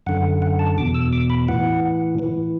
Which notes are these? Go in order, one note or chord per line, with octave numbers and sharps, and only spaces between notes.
F#2 D3 F#5
F#5
A5
E2 B2 D6
E6
D6
B5
A2 E3 F#5
A2 E3